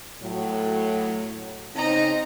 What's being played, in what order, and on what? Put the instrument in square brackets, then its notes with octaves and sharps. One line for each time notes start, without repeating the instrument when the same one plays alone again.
[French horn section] A2 F#3
[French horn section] C#3 C4 D#4 [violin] D#5 A#5